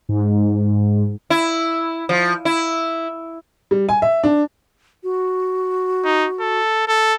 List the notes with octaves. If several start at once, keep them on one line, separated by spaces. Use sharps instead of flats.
G#2
E4
F3
E4
G3
G#5
E5
D4
F#4
D#4
A4
A4